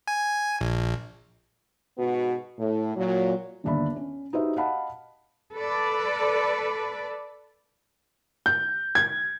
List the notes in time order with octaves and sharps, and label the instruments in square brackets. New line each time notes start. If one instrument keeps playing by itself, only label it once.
[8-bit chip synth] G#5
A#1
[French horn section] G#2 B2 B3 F#4
A2
A#2 F#3
[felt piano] G1 D#2 D4 E5 B5
C#4
D#4 F#4 G4 B4 C5 E5
D#5 F5 F#5 A5 B5
[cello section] A4 B4 D5
[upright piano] G6
G#6